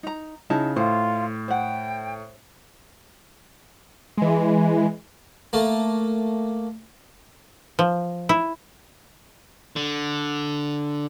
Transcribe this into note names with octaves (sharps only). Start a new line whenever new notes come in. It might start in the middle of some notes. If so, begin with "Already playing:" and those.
D#4 A#5
C#3 D#4 E4 A5
A2 F4 C5
C5 F#5 G5
E3 G#3
A3 A#3
F3
E4
D3